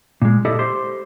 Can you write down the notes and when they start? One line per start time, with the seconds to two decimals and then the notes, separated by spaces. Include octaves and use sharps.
0.22 A#2 G#3
0.45 E4 G4 A4 D5 D#5
0.59 G4 C5 C6